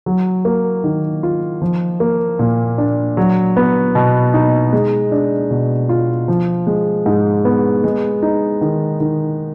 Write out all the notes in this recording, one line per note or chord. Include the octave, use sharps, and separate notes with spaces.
F#3
A#3
D#3
F4
F3
A#3
A#2
D4
F#3
B3
B2
D#4
G#3
D4
B2
F4
F3
G#3
G#2
B3
G#3
D#4
D#3
D#3